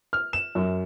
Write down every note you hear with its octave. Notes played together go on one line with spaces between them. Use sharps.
F6
E7
F#2